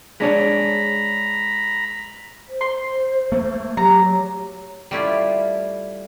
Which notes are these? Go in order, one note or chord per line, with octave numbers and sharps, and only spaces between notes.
G#3 D4 C#5 A#5 B5
C5
C6
A3 A#3
F#3 G4 A#5
C#5
G3 A3 E4 F4